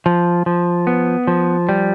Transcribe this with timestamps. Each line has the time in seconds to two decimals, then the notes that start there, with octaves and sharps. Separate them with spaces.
0.06 F3
0.46 F3
0.87 B3
1.27 F3
1.69 G3